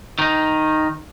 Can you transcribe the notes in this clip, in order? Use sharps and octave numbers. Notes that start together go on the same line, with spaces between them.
D#3 D#4